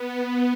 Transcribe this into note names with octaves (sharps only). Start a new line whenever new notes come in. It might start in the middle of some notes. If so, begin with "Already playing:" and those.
Already playing: B3